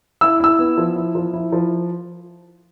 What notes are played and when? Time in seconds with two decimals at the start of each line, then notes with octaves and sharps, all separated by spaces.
0.21 E4 E6
0.40 E4 E6
0.59 B3
0.78 F3
0.96 E4
1.15 F3
1.34 E4
1.52 F3